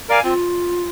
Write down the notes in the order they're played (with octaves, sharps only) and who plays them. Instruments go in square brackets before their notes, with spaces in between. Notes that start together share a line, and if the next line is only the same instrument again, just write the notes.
[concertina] A#4 D5 F5 G#5
[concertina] C4 [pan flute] F4